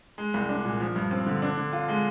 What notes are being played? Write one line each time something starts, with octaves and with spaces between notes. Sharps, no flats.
G#3
C2
D4
A#2
F3
G2
C4
D3
D4
D3
F4
G#3